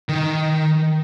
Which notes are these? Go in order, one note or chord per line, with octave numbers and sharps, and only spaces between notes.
D#3